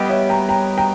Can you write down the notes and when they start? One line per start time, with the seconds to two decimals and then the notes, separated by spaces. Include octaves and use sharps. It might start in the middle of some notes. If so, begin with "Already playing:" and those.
Already playing: G3 B3 G4 B4 D#5
0.09 C#5 E5
0.29 G5 A#5
0.49 G5 A#5
0.78 G5 A#5